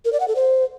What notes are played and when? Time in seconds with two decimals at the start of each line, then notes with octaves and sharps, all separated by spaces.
0.05 A#4
0.13 D5
0.20 F#5
0.28 A4
0.36 C5